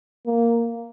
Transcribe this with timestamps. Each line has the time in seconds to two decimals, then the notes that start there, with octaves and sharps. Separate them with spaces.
0.26 A#3